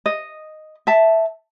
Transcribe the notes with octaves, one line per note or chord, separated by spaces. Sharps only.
D#5
E5 A5